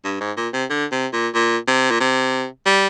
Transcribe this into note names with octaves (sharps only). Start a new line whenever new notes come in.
G2
G#2
A#2
C3
D3
C3
A#2
A#2
C3
A#2
C3
G3